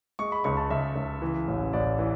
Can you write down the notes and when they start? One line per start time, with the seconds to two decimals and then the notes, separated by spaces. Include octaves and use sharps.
0.19 G#3 C#6
0.32 B5
0.44 C#2 C#6
0.57 A5
0.70 C#2 E5
0.96 C#2
1.22 E3
1.48 A1
1.73 A1 D5
1.99 E3